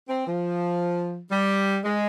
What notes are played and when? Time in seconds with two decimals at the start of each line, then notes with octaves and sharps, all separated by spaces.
0.09 C4
0.26 F3
1.31 G3
1.84 G#3